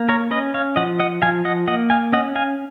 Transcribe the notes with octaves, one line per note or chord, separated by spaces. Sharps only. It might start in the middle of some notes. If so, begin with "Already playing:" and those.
Already playing: A#3
A#4 C#5
C#4 B4 D#5
C#5 F5
F3 D#5 F#5
D#5 F#5
F3 F5 G#5
D#5 F#5
A#3 D#5 F#5
F5 G#5
C#4 D#5 F#5
F5 G#5